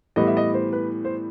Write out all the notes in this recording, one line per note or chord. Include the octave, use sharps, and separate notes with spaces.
A2 E3 G3 B3 D#5
E5
D#5
C5
B4
C5